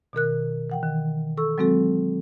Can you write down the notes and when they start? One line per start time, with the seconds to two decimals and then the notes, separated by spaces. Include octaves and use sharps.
0.13 B2 D#3 A#4 F#6
0.70 E3 F#5 G5
0.83 D#3
1.37 A4 C#6 E6
1.58 F#3 G#3 C4 F#4 A4